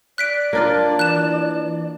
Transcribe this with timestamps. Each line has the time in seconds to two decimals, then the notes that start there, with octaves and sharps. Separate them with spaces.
0.18 D5 F#6 B6 D7
0.53 A#3 D4 F4
0.99 E3 F#6 E7